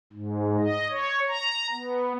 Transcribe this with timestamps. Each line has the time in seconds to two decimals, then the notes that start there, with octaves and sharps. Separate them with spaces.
0.13 G#2
0.59 D#5
0.90 C#5
1.28 A#5
1.71 B3